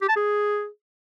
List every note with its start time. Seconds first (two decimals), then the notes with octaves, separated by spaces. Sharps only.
0.01 G4
0.09 A5
0.16 G#4